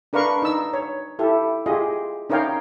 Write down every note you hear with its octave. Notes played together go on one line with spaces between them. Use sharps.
D4 A#4 B4 F5 C#6
D#4 E6
C#5
E4 G4 A4
F4 G4 G#4 D#5
C#4 D#4 A#4 C#5 F5 G5